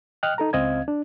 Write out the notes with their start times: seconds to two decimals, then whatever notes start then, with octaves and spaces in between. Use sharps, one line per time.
0.23 D#5 G5 F6 F#6
0.38 D#4 A4 A#5
0.53 C#2 C4 D#5 F5 G#6
0.88 D4